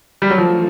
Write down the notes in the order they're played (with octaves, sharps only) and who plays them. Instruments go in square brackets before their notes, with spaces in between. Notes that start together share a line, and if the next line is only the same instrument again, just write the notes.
[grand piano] G3
F#3
[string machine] E3 A3 D4 F4 A4 [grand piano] F3